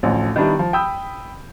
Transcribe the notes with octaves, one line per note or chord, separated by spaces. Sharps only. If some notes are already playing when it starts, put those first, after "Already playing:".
A1 D2 F3
D#3 G3 B3 D4 E4
F3
G5 B5 D#6 E6 G6